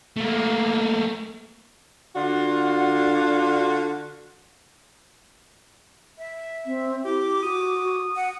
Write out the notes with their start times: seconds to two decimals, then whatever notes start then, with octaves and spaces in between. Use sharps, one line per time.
0.17 A3 A#3
2.16 D3 D4 F4 F#4
6.18 E5
6.66 C4
7.05 E4 G4 D6
7.42 F#4 D#6
8.16 F#5